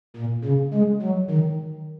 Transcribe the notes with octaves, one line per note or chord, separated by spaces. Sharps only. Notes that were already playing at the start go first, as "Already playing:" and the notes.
A#2
C#3
G#3
F#3
D#3